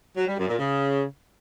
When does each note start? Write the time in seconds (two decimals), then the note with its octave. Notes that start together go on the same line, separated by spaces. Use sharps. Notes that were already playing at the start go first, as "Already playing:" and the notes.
0.16 F#3
0.27 G3
0.37 F#2
0.48 A#2
0.58 C#3